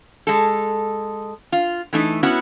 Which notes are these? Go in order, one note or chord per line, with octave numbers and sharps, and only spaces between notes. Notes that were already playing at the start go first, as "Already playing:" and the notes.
G#3 A4
F4
E3 A3 D#4
B3 C#4 E4 F#4